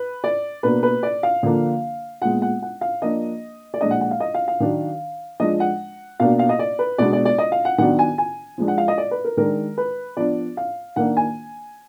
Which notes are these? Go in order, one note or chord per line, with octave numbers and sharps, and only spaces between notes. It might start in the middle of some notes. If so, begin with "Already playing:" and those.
Already playing: B4
D5
B2 A#3 D4 B4
B4
D5
F5
D3 F3 A#3 D4
A#2 G#3 B3 F#5
F#5
F#5
F5
F3 A#3 D4 D#5
D5
A#2 F3 G#3 D4 D#5
F#5
F#5
F5
D#5
F5
F5
D#3 F#3 D4
F3 G#3 D4 D#5
F#5
B2 A#3 D4 F5
F5
D#5
D5
B4
B2 G#3 B3 D4 D5
D5
D5
D#5
F5
F#5
D#3 F#3 B3 D4 F#5
G#5
G#5
F3 G#3 D4
F#5
F5
D#5
D5
B4
A#4
D#3 G#3 D4 A#4
B4
F3 B3 D4 D5
F5
D#3 A#3 D4 F#5
G#5